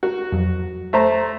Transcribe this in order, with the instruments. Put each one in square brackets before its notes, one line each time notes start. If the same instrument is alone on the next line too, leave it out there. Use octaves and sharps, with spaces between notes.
[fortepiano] F#4 [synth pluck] A#4
[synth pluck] F2 F#3
[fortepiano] A3 C5 A#5